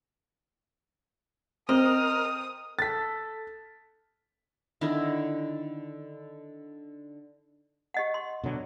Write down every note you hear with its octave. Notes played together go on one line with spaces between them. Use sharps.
C4 A#4 D#5 D#6 F6
A4 A6 B6
D3 D#3 D4 E4
G4 D#5 F#5
C6
B2 D3 F#3